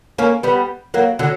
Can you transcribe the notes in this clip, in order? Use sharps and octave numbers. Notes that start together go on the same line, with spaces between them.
A#3 C#4
G3 B3
F#3 A#3
D3 F#3